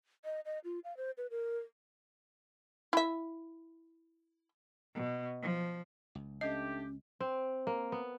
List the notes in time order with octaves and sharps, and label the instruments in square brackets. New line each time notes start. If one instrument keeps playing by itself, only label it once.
[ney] D#5
D#5
F4
F5
C5
B4
A#4
[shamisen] E4 E5
[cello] B2
F3
[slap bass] C#2
[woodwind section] A3 D4 G4 [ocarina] C#4 [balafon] D#5
[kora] C4
A#3
B3